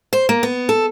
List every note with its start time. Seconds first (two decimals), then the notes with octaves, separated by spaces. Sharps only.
0.13 C5
0.29 A#3
0.43 B3
0.69 A4